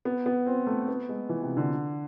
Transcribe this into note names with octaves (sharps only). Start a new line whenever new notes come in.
B3
B3
C4
A3
B3
G#3
E3
C3
D3